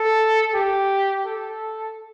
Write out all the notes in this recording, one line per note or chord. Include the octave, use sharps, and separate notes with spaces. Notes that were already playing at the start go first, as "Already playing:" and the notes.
Already playing: A4
G4
A4